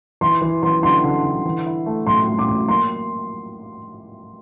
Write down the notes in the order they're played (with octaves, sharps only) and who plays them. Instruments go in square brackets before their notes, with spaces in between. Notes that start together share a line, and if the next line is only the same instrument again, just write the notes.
[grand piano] E3 [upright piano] C6
[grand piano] E3
[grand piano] E3 [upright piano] C6
[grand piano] D3 [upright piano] C6
[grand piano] D3
D3
E3
E4
A3
[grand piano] A2 [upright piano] C6
[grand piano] A3
[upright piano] D6
[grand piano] A2
[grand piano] A#3 [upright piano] C6